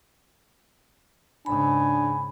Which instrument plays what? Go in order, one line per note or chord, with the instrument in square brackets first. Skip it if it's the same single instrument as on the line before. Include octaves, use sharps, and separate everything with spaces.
[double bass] G#2 C#3 [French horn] D4 [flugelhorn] G#5 [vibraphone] B5